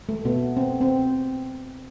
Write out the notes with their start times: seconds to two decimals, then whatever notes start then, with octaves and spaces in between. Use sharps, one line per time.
0.09 A3
0.25 B2 B3
0.57 C4
0.81 C4